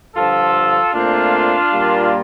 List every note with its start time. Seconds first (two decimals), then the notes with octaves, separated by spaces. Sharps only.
0.15 G2 D3 F3 F4 A4
0.94 A#2 A3 C4 D4 F4
1.72 A#2 G3 A#3